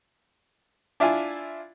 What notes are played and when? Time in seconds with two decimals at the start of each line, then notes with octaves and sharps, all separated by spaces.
1.00 D4 E4 F4 G#5